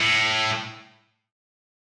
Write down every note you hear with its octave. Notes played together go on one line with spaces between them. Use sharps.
A2